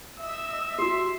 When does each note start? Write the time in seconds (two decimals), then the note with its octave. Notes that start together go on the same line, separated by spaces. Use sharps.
0.19 D#5 E5 E6
0.79 F#4 G4 C6